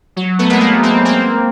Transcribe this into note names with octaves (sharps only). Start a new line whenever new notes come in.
F#3
A3 B3
G#3 A#3
A3 B3
A#3 C4
A#3 C4